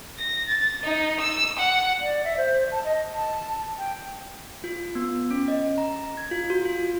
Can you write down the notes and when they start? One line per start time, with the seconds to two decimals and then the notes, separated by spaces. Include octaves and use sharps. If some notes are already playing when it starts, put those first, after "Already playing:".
0.18 A#6
0.48 A6
0.84 D#4
1.21 E6
1.59 F#5
2.01 D5
2.25 E5
2.37 C5
2.72 A5
2.85 D#5
3.14 A5
3.78 G5
4.64 F4
4.95 B3
5.31 C#4
5.48 D#5
5.78 A#5
6.17 G#6
6.31 F4
6.50 F#4
6.65 F4